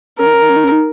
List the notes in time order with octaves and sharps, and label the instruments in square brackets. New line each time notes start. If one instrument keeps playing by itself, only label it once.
[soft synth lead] C#4 [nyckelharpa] A#4
[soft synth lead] D#4
C#4
D#4
C#4
D#4
C#4
D#4